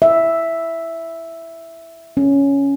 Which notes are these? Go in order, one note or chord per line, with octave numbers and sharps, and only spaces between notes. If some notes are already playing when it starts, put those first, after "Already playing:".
E5
C#4